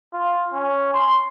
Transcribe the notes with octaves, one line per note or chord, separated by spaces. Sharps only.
F4
C#4
C6